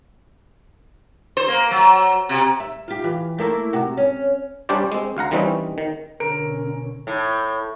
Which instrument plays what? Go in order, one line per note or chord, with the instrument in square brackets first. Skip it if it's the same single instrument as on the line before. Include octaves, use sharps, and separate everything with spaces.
[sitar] C5
A#3
F#3
C3
[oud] E5
F4 G4
E3
A3 A#3 E4
C3 F#4
C#4
[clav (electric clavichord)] G3 C#4 D4 G4 C5 D5
G#3 C4
D2 F5 F#5 A#5
D#3 E3 G3 C4 C#4 D#4
D#3
[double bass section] B2 D3 C#4 [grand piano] A#4 D7
[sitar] A2